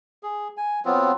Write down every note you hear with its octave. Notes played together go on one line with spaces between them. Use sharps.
G#4
G#5
F#3 B3 C4 F4